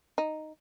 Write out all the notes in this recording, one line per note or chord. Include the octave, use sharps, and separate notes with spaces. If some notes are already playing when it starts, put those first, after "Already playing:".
D#4